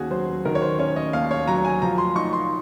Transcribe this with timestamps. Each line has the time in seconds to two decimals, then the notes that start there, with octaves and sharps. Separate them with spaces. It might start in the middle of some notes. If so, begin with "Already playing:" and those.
Already playing: D#2 D#3 C#4 F#4 G#4
0.10 F#3 C5
0.45 D#3 A#4
0.55 C#5
0.62 C5
0.79 C#4 C#5
0.96 D#5
1.13 D#2 F5
1.31 C#5
1.48 F#3 A#5
1.65 G#5
1.82 F3 A#5
1.98 C6
2.16 D#4 C#6
2.33 C6